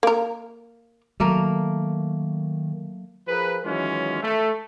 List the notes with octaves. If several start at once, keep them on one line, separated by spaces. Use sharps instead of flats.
A#3 A#4
D#3 F#3 A3 A#3 A#4
F3 G#4 A#4 B4
D#3 E3 F#3 G#3 C#4 F4
A3